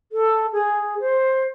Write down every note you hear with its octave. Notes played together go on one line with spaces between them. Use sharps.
A4
G#4
C5